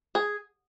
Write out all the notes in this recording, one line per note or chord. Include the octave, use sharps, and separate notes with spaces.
G#4